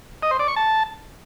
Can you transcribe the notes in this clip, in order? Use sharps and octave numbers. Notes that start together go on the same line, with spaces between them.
D#5
C5
D5
C#6
A5